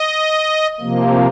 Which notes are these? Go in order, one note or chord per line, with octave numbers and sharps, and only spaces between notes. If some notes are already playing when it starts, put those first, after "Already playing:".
Already playing: D#5
C3 F3 A#3